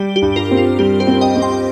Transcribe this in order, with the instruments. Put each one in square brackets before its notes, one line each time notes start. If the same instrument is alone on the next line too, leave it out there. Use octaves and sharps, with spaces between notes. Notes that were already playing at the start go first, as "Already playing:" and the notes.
Already playing: [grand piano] G3 [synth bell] G4
[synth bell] G4
[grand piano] G2
[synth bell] F4 A#4
[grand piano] C4
[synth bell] F4
[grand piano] G3 [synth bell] G4
[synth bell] G4 C5
[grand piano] C4
[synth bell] D#5 G5
[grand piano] C4
[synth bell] G5 C6